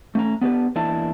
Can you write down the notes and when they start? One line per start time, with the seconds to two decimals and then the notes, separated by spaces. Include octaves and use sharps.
0.15 A3 C#4 A#5
0.41 B3 D4 G4 B4
0.76 E2 A#3 D4 E4 A5